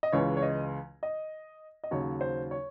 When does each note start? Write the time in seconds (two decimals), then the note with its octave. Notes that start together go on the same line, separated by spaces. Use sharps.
0.03 D#5
0.12 C#2 C#3 E3 G#3 C#5
0.37 C#5
0.43 D#5
1.03 D#5
1.84 D#5
1.91 D#2 C#3 F#3 C#5
2.21 C5
2.51 C#5